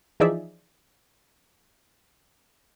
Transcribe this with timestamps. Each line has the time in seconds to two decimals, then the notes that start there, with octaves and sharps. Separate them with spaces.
0.20 E3 F3 D#4 G#4 D5 E5